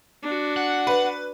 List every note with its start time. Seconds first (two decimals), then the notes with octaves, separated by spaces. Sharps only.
0.23 D4 F#4
0.56 F#5
0.87 B4